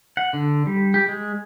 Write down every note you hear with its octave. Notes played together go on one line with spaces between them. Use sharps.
F#5
D3
G3
G4
G#3